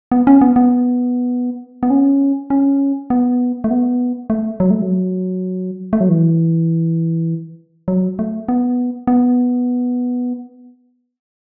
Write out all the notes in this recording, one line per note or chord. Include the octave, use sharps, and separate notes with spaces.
B3
C#4
B3
B3
B3
C#4
C#4
B3
A3
B3
A3
F#3
A3
F#3
A3
F#3
E3
F#3
A3
B3
B3